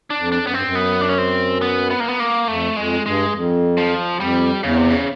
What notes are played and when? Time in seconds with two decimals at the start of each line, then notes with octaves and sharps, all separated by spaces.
0.10 D4
0.18 F2
0.32 D4
0.46 F#2 B3
0.54 G2 C4
0.64 F#2
0.75 B3
1.01 D4
1.09 C#4
1.18 C4
1.61 B3
1.91 B3
2.00 A#3
2.08 B3
2.20 A#3
2.48 F2 A3
2.76 F2 G#3
3.05 G2 G#3
3.34 F2
3.77 F3
4.20 F2 G3
4.63 E2 C#3
4.77 C3
4.90 C#3